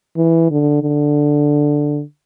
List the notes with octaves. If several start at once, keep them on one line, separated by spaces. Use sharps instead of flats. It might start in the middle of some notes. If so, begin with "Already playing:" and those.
E3
D3
D3